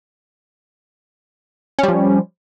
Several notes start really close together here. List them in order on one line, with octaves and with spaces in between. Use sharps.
C#4 G3 F3